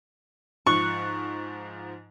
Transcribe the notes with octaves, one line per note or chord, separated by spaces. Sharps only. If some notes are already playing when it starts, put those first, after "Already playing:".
G#2 F3 C#6 F#6